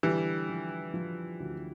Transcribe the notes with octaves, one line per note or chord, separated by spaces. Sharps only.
D3 E3 G3
F3
F3
D2